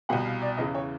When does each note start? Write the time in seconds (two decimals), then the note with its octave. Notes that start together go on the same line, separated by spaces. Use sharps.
0.09 C2 B2 F#5
0.25 F5
0.42 D5
0.57 E2 C#3 E3 D#5
0.75 C#5